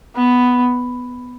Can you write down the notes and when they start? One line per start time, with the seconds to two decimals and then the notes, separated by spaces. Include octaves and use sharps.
0.16 B3